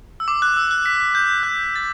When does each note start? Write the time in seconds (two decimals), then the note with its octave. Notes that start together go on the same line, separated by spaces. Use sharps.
0.20 E6
0.28 D6
0.42 F#6
0.57 E6
0.71 F#6
0.86 B6
1.15 G6
1.43 F#6
1.64 G6
1.76 A6